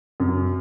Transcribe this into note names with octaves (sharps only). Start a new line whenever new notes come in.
F#2